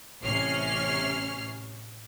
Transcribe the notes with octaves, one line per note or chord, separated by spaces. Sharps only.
A1 C3 C#4 F6 C7